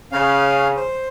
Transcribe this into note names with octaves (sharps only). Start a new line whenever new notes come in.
C#3 C#4 F5
C5